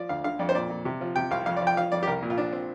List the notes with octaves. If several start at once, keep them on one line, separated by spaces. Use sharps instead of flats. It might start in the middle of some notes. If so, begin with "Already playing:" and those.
Already playing: F3 D5
D2 F5
D3 F5
F2 D5
C5
A#2 D5
A#2
C3
F3
C3 G5
C2 F5
F2 F5
F3 D5
G5
F3 F5
F2 D5
G4
C2 A#4
A#2
F4
F3 D4
C4